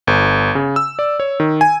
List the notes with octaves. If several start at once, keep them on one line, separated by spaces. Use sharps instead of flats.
G1
C#3
E6
D5
C#5
D#3
G#5